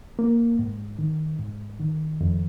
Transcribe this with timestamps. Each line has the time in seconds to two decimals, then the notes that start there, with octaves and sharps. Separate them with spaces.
0.19 A#3
0.59 G#2
0.99 D#3
1.39 G#2
1.79 D#3
2.21 F2